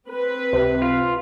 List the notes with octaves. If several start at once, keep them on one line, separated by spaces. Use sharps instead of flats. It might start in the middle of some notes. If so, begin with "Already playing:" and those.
C4 B4
C#2 C3
F4